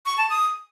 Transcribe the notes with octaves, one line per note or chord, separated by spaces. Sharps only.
C#6
A5
D#6